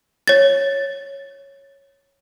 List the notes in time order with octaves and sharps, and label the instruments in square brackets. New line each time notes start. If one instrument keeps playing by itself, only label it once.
[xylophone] C#5 A6